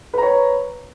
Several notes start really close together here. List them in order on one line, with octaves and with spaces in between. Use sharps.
B4 A#5 C#5